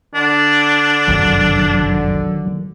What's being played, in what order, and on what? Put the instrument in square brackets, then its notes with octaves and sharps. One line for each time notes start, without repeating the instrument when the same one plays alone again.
[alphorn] D3 [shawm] D4
[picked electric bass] G1 C2 F#2 [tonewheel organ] D#3 F#3